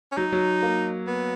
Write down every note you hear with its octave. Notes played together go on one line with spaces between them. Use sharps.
C#4
F#3 D#4
F#3
A#3
B3